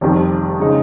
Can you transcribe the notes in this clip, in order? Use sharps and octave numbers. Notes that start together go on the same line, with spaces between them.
F1 F2 D#3 G3
C#3 G#3 D#4